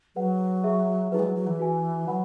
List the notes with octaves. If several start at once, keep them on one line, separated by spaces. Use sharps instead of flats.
F#3 G#4 B4 F#5
G#4 E5 C#6
F#3 E4 G#4 B4
G#3
F#3
F#3
E3
F#4 B4 E5 G#5
F#3 B4 F#5 B5